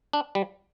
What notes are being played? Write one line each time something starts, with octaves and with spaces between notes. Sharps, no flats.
D4
G3